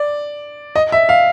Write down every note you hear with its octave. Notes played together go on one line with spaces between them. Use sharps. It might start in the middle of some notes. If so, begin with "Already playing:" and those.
Already playing: D5
D#5
E5
F5